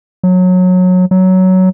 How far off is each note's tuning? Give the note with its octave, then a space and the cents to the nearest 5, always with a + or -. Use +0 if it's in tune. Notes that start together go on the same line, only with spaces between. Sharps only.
F#3 -20
F#3 +10